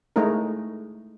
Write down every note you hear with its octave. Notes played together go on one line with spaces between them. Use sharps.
G#3 A3 D#4 E4 A#4